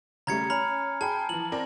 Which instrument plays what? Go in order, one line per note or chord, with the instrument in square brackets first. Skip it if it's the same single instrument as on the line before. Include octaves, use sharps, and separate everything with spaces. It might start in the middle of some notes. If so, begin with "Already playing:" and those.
[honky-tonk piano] C#3 G3 A3 [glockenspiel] A#5 G#6 C#7
[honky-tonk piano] C#4 [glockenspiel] A#5 B5 F6
[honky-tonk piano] G#4 G5 B5 [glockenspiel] A5
[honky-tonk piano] E3 F3 [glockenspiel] F#7
[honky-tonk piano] C4 A#4 D5